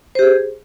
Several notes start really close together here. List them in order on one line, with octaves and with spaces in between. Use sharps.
C5 G4 G#4